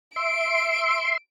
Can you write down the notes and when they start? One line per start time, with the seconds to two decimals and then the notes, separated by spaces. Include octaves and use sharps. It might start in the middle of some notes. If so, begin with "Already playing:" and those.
0.16 E5 C6 D7